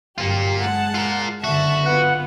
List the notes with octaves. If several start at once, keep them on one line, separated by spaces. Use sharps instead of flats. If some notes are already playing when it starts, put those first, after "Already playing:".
G1 F#2 A#3 F4 G4
G#3 G#4 F#5 A5
F4 A#4
F#1 D3 F#4 E5 A5
B3 F4 F#5